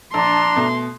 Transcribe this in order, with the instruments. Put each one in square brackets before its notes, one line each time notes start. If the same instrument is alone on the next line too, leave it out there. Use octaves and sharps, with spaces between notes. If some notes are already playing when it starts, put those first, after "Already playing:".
[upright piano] A#1 [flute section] D4 A5 A#5 [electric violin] C6
[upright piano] B2 A3